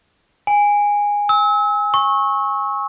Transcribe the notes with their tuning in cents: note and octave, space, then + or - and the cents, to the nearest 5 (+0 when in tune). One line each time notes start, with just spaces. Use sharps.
G#5 -15
E6 -35
C#6 -20